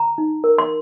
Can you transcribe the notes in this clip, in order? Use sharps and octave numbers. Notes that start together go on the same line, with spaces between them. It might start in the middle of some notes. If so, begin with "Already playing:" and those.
Already playing: A#5
D#4
A#4
C6